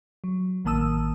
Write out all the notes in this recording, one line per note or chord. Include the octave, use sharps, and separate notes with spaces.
F#3
A1 D#3 A#3 A5 D#6 E6